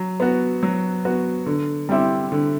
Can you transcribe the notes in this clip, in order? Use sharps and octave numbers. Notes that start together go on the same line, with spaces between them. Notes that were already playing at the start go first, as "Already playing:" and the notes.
Already playing: F#3
B3 F#4
F#3
B3 F#4
D3
G3 C4 E4 G4
D3